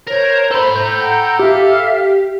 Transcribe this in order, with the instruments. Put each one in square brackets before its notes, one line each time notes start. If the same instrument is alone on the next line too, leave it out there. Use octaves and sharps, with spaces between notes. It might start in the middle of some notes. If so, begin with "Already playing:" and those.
[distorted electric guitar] A#4 [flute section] C5 C#5
[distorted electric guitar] A4 B5 [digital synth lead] C5 [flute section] A#5
[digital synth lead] G6
[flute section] F#5 G5 A#5
[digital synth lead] G4 [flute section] E5 F5 F6